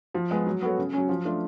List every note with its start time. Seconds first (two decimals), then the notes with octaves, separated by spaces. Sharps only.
0.14 F3
0.31 G#3 B3
0.46 F#3
0.62 B3 F#4 A4 C#5
0.78 C#3
0.93 F#3 C#4
1.09 F3
1.25 A3 D4 F4